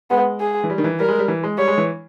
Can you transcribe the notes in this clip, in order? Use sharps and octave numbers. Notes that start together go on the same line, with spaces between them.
G#3 B3
G#4
E3
G3
D#3
E3
G3 A#4
G#3
G3
E3
G#3
G3 C#5
G#3
E3